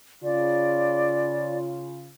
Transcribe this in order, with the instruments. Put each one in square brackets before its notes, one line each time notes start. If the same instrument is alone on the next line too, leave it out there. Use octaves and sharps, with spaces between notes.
[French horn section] C#3 F4 [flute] D5